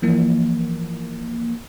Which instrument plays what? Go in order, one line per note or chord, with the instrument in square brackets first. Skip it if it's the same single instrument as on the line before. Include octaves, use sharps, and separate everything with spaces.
[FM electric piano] E3 F3 A#3